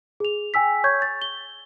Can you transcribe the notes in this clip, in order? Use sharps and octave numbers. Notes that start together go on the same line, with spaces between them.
G#4 F7
G5 G#5 E6 B6
C#5 C#6 G6 G#6
A6
G7